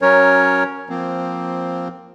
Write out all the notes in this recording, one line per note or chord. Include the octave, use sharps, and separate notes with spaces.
F#3 C#4 A#4 C#5
F3 A#3 C4